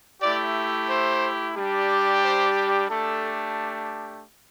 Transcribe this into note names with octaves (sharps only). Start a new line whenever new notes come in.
A3 E4 G4 D5
C5
G3 D4 G4
C5
A3 D4 G4 A4